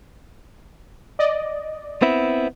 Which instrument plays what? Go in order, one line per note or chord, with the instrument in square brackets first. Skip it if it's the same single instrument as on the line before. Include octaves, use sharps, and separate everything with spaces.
[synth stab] D5 D#5
[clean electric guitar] B3 C4 E4